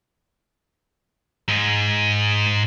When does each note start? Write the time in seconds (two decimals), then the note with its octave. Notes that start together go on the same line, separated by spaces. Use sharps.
1.48 G#2 G#3